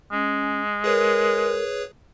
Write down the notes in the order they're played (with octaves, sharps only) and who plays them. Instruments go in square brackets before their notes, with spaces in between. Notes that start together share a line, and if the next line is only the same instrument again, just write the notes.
[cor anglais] G#3 [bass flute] C#4
[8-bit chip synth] G#4 B4 C#5 [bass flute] A#4